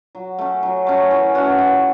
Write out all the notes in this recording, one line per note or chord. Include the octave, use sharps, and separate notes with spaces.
F#3
A3 C#4
F#3
A3 C#4
E3
A3 C#4 F#4
E3